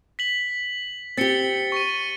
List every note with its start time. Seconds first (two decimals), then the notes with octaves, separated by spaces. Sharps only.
0.19 B6 F#7
1.17 C4 G4 A6 C#7 G7
1.72 C#6 D#7